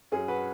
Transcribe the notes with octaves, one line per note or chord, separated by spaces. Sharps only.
F#2 F#3 C#4 G#4
F#4 B4